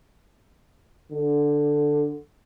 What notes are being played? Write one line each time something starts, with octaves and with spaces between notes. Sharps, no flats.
D3